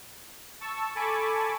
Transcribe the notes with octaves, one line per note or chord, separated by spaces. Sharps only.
A5 C#6 E6
A4 G#5 A5 B5 C#6 D6